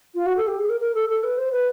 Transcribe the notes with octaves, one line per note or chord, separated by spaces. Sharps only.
F4
F#4
A4
G4
G#4
A#4
A#4
A4
A4
B4
C5
B4